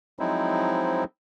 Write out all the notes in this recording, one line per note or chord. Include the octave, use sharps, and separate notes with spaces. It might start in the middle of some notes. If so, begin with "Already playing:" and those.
F3 F#3 G#3 C4 D#4 E4